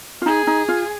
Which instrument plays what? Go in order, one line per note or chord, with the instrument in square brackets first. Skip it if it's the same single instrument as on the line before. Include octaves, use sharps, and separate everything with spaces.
[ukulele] F4
[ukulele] D#4 [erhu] G#4
[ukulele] D#4
F4